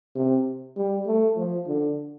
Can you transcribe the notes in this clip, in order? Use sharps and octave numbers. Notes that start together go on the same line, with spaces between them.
C3
G3
A3
F3
D3